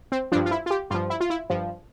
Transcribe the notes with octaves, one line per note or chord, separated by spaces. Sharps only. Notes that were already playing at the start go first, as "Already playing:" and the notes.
C4
G2 F3 D4
F4
E4
F4
G4
G2 F3 F4
E4
F4
E4
G2 F3